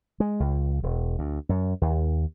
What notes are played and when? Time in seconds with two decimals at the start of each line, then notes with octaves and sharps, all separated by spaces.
0.20 G#3
0.40 C#2
0.83 E1
1.19 D2
1.49 F#2
1.82 D#2